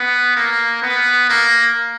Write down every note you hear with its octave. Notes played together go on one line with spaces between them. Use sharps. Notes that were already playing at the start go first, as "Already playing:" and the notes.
Already playing: B3
A#3
B3
A#3